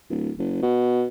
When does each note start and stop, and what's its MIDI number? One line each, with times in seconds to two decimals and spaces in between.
0.10 0.31 26
0.39 0.59 30
0.62 1.06 47